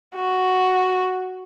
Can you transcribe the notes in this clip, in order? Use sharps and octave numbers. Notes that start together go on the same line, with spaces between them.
F#4